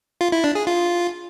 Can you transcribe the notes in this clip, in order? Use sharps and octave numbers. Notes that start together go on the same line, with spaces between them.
F4
E4
D4
G#4
F4